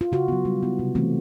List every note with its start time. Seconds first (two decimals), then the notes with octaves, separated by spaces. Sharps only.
0.01 F4
0.12 C#3 F#4
0.28 F#3 B3
0.45 G3
0.63 B3 E4
0.79 C3
0.95 E3 A3 C4